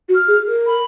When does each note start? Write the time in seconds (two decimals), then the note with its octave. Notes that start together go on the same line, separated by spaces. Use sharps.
0.09 F#4
0.15 F6
0.28 G#4
0.47 A#4
0.67 B5